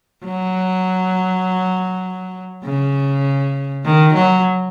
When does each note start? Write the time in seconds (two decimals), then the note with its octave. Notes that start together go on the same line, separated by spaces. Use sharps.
0.25 F#3
2.65 C#3
3.85 D#3
4.15 F#3